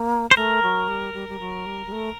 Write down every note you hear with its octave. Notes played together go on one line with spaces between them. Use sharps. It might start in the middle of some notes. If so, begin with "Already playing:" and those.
Already playing: A#3
C5
A3 A#4
F#3
G3
G3
G3
F#3
G3
G3
A3